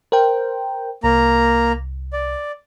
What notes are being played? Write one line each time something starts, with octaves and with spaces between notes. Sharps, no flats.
A#4 C5 G5
C2 A#3 A#5
D5